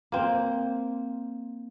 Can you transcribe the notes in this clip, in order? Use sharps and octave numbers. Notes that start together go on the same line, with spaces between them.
A#3 C4